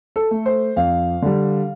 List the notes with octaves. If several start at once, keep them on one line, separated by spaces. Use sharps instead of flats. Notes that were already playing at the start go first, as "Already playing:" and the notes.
A4
A3
C5
F2 F5
D3 G3